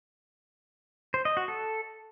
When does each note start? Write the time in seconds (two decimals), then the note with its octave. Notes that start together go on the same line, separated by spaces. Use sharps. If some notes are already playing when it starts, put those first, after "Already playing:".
1.14 C5
1.25 D#5
1.37 F#4
1.48 A4